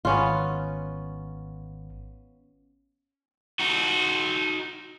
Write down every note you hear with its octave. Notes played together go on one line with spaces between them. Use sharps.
G#1 B3 C#4 F4
D#4 F#4